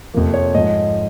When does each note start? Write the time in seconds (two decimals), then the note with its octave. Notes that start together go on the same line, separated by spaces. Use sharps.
0.14 F2 C3 F3 A#3
0.34 C#5
0.54 G#2 F3 G#3 D#5